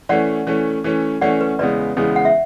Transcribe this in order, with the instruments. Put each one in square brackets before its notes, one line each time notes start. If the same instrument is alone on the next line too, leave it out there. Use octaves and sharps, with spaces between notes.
[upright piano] E3 A3 C#4 [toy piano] D5 F#5
[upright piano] E3 A3 C#4
E3 A3 C#4
[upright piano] E3 A3 C#4 [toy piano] D5 F#5
[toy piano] B4
[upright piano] E2 C#3 G#3 B3 [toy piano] B4 D5
[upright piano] E2 C#3 G#3 B3
[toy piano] F#5
E5